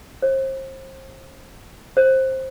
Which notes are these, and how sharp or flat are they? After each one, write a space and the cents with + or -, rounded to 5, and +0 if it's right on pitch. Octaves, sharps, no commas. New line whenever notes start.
C5 +35
C5 +15